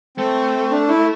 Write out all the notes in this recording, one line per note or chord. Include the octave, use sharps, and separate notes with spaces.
A3 C4
D4
E4